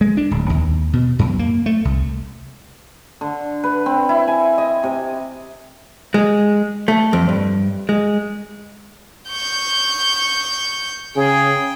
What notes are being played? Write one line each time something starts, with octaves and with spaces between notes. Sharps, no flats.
G#3
D4
D1
D#2
B2
F#2
A#3
A3
C2
D3
B4
C4
E4
G#5
D#5
C3
G#3
A3
F2
G2
G#3
C#6 G6
C#3 G#4 G5